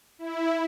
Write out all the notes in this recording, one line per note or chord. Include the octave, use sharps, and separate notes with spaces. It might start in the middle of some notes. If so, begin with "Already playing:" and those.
E4